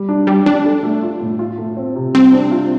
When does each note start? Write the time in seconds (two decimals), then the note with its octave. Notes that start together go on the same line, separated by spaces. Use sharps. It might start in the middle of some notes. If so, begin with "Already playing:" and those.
Already playing: G3
0.09 D4
0.27 G3 G4
0.46 G3 D4
0.65 A4
0.83 A3
1.03 F4
1.21 A2
1.39 F4
1.58 A3
1.77 C4
1.96 C3
2.15 G3 C4
2.33 D4
2.51 F4